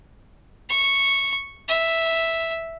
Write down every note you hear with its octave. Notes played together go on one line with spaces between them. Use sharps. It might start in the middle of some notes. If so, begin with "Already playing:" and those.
C#6
E5